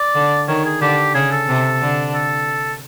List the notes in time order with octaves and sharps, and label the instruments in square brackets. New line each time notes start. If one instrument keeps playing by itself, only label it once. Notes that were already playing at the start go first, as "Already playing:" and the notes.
Already playing: [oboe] D5
[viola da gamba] D3
[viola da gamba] D#3 [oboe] C#5
[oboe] G#4
[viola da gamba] D3 [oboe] G4
[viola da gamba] C#3 [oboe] G#4
[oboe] A4
[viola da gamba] C3
D3
[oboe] A4